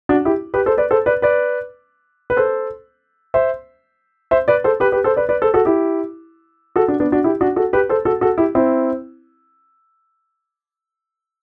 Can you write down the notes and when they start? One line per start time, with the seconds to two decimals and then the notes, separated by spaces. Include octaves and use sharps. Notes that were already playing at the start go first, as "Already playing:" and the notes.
0.09 D4 F#4
0.25 E4 G4
0.54 G4 B4
0.66 A4 C5
0.78 B4 D5
0.91 A4 C5
1.06 B4 D5
1.22 B4 D5
2.30 B4
2.37 A4 C5
3.34 C5 E5
4.31 C5 E5
4.48 B4 D5
4.64 A4 C5
4.80 G4 B4
4.92 G4 B4
5.04 A4 C5
5.17 B4 D5
5.29 B4 D5
5.42 A4 C5
5.54 F#4 A4
5.65 E4 G4
6.76 F#4 A4
6.88 D4 F#4
7.00 B3 D4
7.12 D4 F#4
7.24 E4 G4
7.41 D4 F#4
7.56 F#4 A4
7.73 G4 B4
7.89 A4 C5
8.05 F#4 A4
8.21 F#4 A4
8.38 E4 G4
8.55 C4 E4